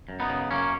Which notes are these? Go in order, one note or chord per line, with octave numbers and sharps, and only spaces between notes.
F#2
B3 D#4
C#3
F#2 A#3 C#4